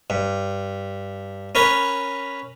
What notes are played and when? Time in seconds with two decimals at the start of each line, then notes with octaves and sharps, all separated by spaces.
0.10 G2
1.55 C#4 A#4 B4 C#5